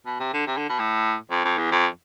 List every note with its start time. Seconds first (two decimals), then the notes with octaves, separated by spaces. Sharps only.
0.06 B2
0.20 C3
0.34 D3
0.47 C3
0.58 D3
0.69 B2
0.79 A2
1.31 F2
1.45 F2
1.58 E2
1.72 F2